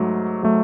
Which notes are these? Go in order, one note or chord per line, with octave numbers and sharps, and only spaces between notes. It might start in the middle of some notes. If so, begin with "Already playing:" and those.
Already playing: G#2 F#3 A3
F#3 A3